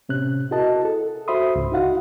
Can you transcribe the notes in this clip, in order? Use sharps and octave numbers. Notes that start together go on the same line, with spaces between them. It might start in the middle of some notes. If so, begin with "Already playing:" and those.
A2 C3 C#4 F#6
E4 F#4 G#4 A#4 D#5 A5
A4
F#4 C5 E5 B5 C6 D#6
C#2 G#2
D#4 E4 F#4 F5 F#5